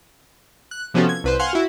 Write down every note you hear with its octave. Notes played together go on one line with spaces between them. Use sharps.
F#6
C3 F3 B3 C#4 F#4 A4
G#6
C2 B4 C5
F5 F#5 G#5 C6 F6
E4 F#4